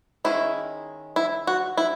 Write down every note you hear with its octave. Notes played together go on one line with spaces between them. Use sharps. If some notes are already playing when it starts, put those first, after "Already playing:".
D#3 G#3 C#4 E4
E4
F#4
E4